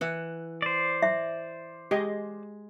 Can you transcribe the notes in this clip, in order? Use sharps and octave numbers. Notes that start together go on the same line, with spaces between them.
E3 F#5
C5 D5
E5
G#3 G4 G#4 D#5